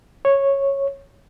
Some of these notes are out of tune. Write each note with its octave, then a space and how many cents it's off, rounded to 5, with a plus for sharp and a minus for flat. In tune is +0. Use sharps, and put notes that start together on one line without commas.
C#5 -10